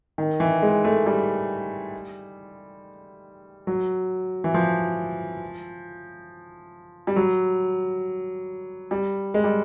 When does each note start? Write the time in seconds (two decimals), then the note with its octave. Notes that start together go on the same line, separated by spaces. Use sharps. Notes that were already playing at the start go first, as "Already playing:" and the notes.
0.18 D#3
0.40 E3
0.62 G#3
0.84 A3
1.06 G3
3.67 F#3
4.44 E3
4.54 F3
7.07 G3
7.16 F#3
8.91 G3
9.34 G#3
9.44 G3